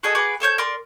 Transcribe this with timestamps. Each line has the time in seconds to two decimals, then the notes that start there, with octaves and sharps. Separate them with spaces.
0.03 F#4 G#4 A4 D#5
0.15 F#4 G#4 B4 D6
0.40 A4 C5 C#5 G6
0.58 A#4 D5 C6